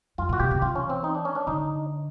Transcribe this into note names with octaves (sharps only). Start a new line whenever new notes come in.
F2 F4
A#2
F#4
B2 G4
C3
E3 F4
C#4
C4
D#4
D4
C#4
D4
D3 D#4